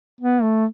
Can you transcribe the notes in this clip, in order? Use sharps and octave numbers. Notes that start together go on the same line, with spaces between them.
B3
A3